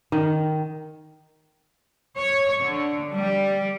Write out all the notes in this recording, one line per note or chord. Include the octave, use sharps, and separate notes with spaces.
D#3
C#5
D3
G3